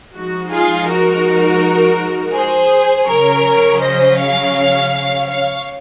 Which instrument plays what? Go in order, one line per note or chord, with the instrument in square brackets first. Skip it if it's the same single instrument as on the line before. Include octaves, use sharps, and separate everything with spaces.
[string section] F3 G#3 D#4 F#4
F4 G#4
F#4 A#4
G#4 C5
C#3 F#3 C#4 A#4 C#5
C5 D#5
C#5 F5
C#5 F5